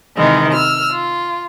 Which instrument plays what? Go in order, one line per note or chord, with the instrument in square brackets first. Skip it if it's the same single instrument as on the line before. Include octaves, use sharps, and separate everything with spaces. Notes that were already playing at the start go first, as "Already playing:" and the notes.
[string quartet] C3 D#3 E3 G#3
E6 F6
F4